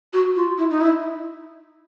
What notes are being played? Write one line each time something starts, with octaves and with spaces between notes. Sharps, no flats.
F#4
F4
E4
D#4
E4